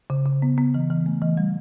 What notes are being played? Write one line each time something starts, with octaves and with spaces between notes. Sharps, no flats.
C#3
C#3
B3
B3
E3
E3
A3
E3
G3